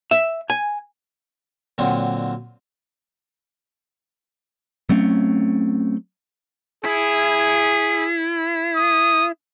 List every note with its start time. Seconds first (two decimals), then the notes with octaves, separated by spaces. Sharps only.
0.11 E5
0.50 G#5
1.78 A#2 D3 F#3 C4 A#4
4.89 F#3 A3 C4 C#4
6.85 E4 G#4
8.77 D#6